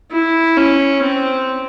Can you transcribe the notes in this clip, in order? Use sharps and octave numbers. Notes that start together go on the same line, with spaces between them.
E4
C#4
C4